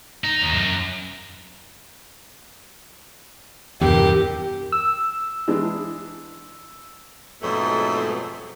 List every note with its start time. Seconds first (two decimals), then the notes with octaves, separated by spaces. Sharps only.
0.24 D#4
0.41 D#2
0.54 F#2
3.81 E2 G2 C3 G4 A#4
4.72 E6
5.48 E3 G#3 D4
7.42 F2 G#2 B2 F#3 A3